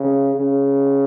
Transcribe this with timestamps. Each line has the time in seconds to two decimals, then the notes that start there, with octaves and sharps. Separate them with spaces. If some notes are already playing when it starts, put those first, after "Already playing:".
Already playing: C#3
0.35 C#3